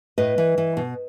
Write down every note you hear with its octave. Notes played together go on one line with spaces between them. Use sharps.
A2 B4 D#5
E3
E3
B2